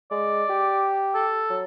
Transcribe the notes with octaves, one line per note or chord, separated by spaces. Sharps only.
G#3 D5
G4
A4
F#3